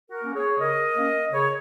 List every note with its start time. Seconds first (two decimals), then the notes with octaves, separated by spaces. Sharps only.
0.10 F#4 A#4
0.23 A#3 C#4
0.34 G#4 C#5
0.59 C#3 A#4 D#5
0.96 A#3 C#4
1.32 C#3 G#4 C#5